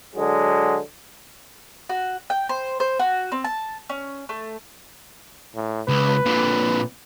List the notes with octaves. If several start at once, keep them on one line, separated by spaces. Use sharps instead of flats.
D3 F#3 G#3
F#4
G5
C5
C5
F#4
C4
A5
C#4
A3
A2
C#2 B4
A#2 D3